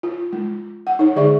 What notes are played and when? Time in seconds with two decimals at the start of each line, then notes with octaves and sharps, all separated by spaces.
0.03 F4
0.33 G#3
0.87 F#5
0.99 D#4 C#5
1.16 D3 G#3 G#4 D5 E5 C#6